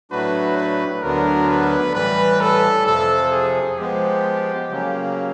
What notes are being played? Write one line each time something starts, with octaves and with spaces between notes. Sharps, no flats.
A2 F#3 A3 D4 F#4 B4
B4
D2 D3 F#3 B3 D4 A#4
B4
A2 E3 G3 B4
A4
F2 C3 F3 A4
G#4
F3 G#3 B3 G4
C#3 F#3 A#3 C#4